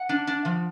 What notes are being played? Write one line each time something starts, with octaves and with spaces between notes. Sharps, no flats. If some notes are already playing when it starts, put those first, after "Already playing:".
Already playing: F#5
D4
D4
F3